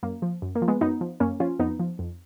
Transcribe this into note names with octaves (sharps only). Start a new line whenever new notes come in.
F#2 A#3
F3
F#2
A#3
F3
G#3 B3
F#2 B3 D#4
F3
F#2 A#3 C#4
F3 C#4 F4
F2 B3 D#4
F3
F2